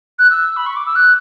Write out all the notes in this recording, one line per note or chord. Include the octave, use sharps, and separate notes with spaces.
F#6
E6
B5
C#6
D6
E6
F#6